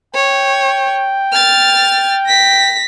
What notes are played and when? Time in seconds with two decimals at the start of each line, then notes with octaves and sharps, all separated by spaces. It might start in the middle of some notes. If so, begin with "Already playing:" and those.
0.15 C#5 G5
1.32 F6 A6
2.27 A#6 B6